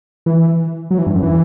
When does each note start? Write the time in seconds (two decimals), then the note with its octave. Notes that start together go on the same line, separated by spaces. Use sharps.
0.26 E3
0.91 F#3
0.98 E3
1.07 G2
1.15 F#2
1.23 E3